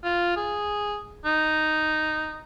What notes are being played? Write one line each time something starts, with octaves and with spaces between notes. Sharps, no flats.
F4
G#4
D#4